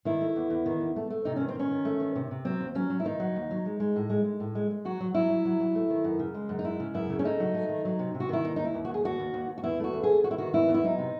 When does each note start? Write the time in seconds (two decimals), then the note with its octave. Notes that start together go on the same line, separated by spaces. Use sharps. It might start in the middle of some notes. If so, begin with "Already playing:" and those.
0.05 D#3 E4
0.21 A3
0.36 E2
0.50 E2
0.66 D#3
0.80 E2
0.96 A3
1.10 A3
1.25 C3 D#4
1.36 D#3 C#4
1.48 C4
1.55 D#3 C#4
1.71 D#3
1.85 A3
2.00 D#3
2.15 C3
2.31 C3
2.45 F#3 C4
2.61 D#2
2.75 F#3 C#4
2.90 F#3
3.00 E4
3.05 D#3 D#4
3.20 F#3
3.36 D#2
3.51 F#3
3.66 G#3
3.80 G#3
3.96 A2
4.10 G#3
4.25 G#3
4.40 A2
4.55 G#3
4.71 G#3
4.85 F#3 F#4
5.00 F#3
5.14 F#3 E4
5.30 F#3
5.45 F#3
5.60 F#3
5.75 A3
5.90 D#3
6.04 F#2
6.19 C#3
6.34 G#3
6.49 F#2
6.59 D#4
6.65 G#3 E4
6.80 C#3
6.94 F#2 E4
7.10 C#3
7.19 C#4
7.24 A3 D#4
7.40 F#3
7.54 A3
7.69 D#3
7.85 F#3
7.99 C3
8.15 C3
8.20 F#4
8.29 D#3 E4
8.44 D#2 D#4
8.56 D#4
8.59 D#2
8.64 E4
8.74 D#2
8.85 F#4
8.89 D#2 G#4
9.05 D#2 F#4
9.19 D#2
9.34 D#2
9.49 D#2
9.58 F#4
9.64 E2 E4
9.80 A3 F#4
9.93 E2
10.03 G#4
10.09 E2
10.24 D#3 F#4
10.31 E4
10.38 D#3 F#4
10.53 E2 E4
10.69 E2
10.74 E4
10.83 F#3 D#4
10.99 C3